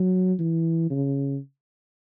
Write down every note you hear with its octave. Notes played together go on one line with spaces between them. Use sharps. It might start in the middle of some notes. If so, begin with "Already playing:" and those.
Already playing: F#3
E3
C#3